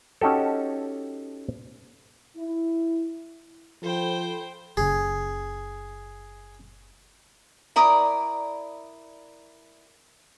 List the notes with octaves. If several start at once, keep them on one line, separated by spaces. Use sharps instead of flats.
C#4 D#4 F#4 G4 A4
E4
F3 A4 C5 G5 B5
F#1 C#3 G#4
E4 A#4 D5 D#6